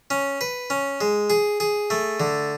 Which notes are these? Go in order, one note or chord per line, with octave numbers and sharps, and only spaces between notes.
C#4
B4
C#4
G#3
G#4
G#4
A3
D3